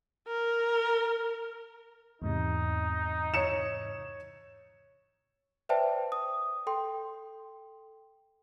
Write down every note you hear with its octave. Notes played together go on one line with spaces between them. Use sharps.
A#4
E2 G#2 C3 D#4
C#5 C#7 E7
B4 C5 D5 E5 G5 A5
D#6
A4 G5 C6